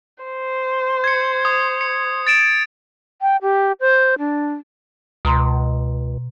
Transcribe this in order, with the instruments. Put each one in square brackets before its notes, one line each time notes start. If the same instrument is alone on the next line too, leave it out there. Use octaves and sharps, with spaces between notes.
[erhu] C5
[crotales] G#6 C#7
D#6
C#7
A6 D7 E7
[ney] G5
G4
C5
D4
[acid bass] C#2 [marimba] B2 A#5 C6